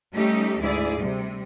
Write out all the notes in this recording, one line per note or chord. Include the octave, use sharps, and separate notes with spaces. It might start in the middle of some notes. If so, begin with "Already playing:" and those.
G3 A3 C#4 D#4 G4
D2 G#2 E4 G#4 D5
C3 G3